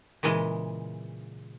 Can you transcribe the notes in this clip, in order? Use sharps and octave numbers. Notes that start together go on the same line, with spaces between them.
A#2 C#3 E3 G#3